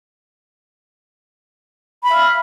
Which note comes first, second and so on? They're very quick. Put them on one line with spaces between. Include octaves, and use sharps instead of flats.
B5 E5 F5